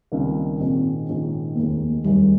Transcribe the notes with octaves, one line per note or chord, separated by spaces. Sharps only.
C#2 C3 D#3 G3 A#3
A#1 G#2 D#3 G#3 C4 C#4
A#1 G#2 D#3 G#3 C#4
F1 D#2 D#3 G#3 A#3
F1 D#2 D#3 G3 G#3